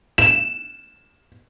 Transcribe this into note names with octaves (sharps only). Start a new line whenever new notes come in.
E7